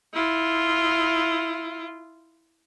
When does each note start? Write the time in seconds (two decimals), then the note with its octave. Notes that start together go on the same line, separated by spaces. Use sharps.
0.14 E4 F4